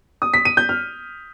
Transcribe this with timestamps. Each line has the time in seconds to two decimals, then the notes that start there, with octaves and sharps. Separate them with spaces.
0.22 D#6
0.34 B6
0.45 D#7
0.57 G6
0.69 F6